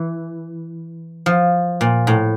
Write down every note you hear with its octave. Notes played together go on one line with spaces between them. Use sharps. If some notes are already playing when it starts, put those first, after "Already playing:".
Already playing: E3
F3
A#2
A2